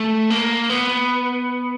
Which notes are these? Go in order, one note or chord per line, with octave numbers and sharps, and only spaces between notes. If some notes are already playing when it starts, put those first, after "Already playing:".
Already playing: A3
A#3
B3